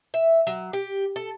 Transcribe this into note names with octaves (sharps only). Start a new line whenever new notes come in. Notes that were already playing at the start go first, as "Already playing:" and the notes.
E5
F#3
G4
A4